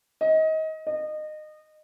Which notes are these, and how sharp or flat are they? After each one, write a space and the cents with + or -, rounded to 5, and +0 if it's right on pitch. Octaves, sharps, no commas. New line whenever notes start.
D#5 +25
D#5 -25